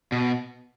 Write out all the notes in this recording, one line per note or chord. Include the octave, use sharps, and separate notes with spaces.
B2